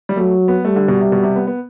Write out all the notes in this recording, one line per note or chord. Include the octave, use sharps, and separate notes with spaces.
G3
F#3 A3
B3
G3 A3
D3
B2
C3
B2
C3
B3
B3